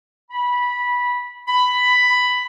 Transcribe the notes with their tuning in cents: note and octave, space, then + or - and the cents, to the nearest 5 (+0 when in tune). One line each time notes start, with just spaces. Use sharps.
B5 -15
B5 +10